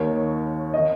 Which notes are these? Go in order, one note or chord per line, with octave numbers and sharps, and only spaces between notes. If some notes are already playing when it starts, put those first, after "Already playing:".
Already playing: D#2 D#3 C#5
D#3 D#5